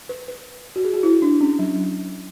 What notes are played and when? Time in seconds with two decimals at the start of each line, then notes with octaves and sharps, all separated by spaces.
0.09 B4
0.28 B4
0.76 F#4
0.85 G#4
0.94 F#4
1.03 E4
1.22 D4
1.41 C#4
1.59 F#3